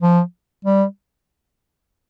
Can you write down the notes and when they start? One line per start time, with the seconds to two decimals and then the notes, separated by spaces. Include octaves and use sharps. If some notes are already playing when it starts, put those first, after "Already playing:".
0.01 F3
0.65 G3